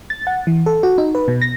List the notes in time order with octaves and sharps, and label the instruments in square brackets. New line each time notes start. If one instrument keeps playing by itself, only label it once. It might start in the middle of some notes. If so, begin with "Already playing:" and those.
[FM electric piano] A6
F#5
E3
A4
F#4
D#4
B4
B2
A#6